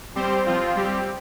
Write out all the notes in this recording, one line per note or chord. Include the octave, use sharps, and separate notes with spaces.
G3 C4 G4 C5
F3 C4 F4
G3 C4 G4